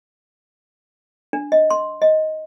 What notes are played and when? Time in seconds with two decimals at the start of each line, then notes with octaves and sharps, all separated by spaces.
1.33 D4
1.52 D#5
1.70 C6
2.02 D#5